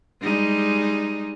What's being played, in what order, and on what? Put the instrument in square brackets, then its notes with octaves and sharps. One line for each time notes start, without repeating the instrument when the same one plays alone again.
[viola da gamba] G3 G#3 D#4